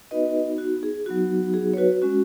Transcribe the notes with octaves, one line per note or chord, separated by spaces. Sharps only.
B3 D#4 F#4 B4 D#5
F#4
G#4
F#3 B3 D#4 F#4
G#4
C#5
F#4 B4
G#3 C#4 F#4